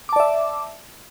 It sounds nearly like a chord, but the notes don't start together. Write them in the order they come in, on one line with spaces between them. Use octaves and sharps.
D6 A5 D5 E5